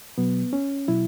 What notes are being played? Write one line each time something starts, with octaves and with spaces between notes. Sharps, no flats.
B2 F#3 B3
C#4
B2 F#3 E4